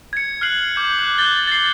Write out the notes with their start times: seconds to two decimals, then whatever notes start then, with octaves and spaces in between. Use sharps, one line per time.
0.13 G#6 C#7
0.41 F6 F#6 C7 F#7
0.76 D6 G6
0.99 F#6
1.18 F#6 G6 A6 G7
1.47 A6 C7